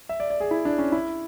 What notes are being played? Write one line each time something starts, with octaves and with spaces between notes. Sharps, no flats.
E5
D5
D5
G#4
E4
D4
C#4
E4